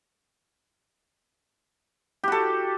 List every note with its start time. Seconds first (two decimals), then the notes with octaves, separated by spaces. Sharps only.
2.24 G4
2.28 F#4
2.32 A4